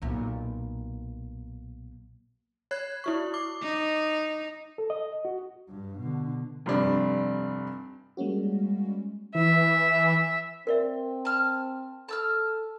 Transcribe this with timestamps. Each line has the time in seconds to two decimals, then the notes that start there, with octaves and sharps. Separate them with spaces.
0.02 B1 A#2
2.71 C#5 F#6 G#6
3.04 E4 F#4 C#6
3.34 D6
3.62 D#4
4.78 A4
4.90 D#5
5.25 F#4
5.69 G2
5.99 B2 D3
6.66 F1 G2 D4
8.17 G3 G#3 A#3 C#4 F#4
9.35 E3 E5
10.67 C4 A#4 D5 E5
11.25 A5 F6
12.09 A4 A5 E6 F6